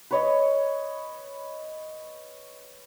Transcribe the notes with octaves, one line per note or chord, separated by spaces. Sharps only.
B4 C#5 D#5